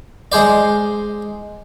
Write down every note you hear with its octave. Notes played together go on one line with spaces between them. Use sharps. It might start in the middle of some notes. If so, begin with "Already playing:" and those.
G#3 G#4 C5 D5